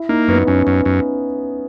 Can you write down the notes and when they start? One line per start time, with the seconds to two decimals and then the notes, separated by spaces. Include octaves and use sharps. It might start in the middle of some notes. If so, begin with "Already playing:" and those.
Already playing: E4
0.09 A#3 D#4
0.28 F#2 B3
0.47 F#2 C#4
0.67 F#2
0.85 F#2